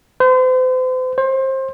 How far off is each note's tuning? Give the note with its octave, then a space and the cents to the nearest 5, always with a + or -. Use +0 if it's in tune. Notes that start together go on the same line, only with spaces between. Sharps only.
C5 -40
C5 +25